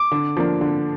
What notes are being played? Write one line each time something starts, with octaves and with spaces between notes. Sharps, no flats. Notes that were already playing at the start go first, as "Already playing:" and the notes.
Already playing: D6
D3
F3 A#3 D4
D3